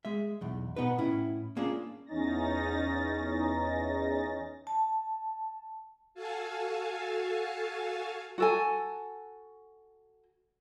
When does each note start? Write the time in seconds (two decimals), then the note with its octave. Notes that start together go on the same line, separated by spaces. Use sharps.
0.05 G#3 E5
0.41 B1 E2
0.76 B2 B3 D#4 B4
0.98 A2 C#4 E4
1.57 A#3 C#4 D4 F4 G#4
2.06 E2 C#4 D#4 A6 A#6
4.67 A5
6.14 F#4 A4 F5 G#5 A5
8.38 F#4 A4 G#5